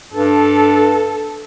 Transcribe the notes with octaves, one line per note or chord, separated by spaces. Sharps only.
G2 A4